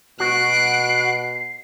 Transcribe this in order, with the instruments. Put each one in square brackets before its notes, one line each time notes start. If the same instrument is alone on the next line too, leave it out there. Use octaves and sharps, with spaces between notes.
[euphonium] B2 [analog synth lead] F#4 [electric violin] F#6 D7 [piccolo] C7